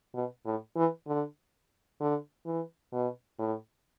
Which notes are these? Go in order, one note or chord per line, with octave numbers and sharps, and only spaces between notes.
B2
A2
E3
D3
D3
E3
B2
A2